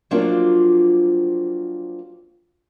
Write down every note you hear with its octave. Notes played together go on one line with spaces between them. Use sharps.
F3 F#3 A#3 C4 D4 F4